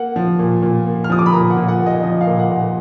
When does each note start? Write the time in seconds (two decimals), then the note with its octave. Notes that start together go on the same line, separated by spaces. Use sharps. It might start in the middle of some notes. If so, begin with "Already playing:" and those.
Already playing: A#3 F#5
0.16 F3
0.39 A#2
0.63 A#2
0.86 A#3
1.04 F6
1.10 F3 D#6
1.19 D6
1.26 B5
1.33 A#2 A#5
1.50 F#5
1.57 A#2
1.68 F#5
1.80 A#3
1.86 D#5
2.03 F3 D#5
2.21 F5
2.27 A#2
2.39 F#5
2.51 A#2
2.56 F#5